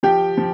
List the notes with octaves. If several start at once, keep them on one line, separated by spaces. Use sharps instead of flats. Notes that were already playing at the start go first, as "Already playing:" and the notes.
F3 G4 G5
F3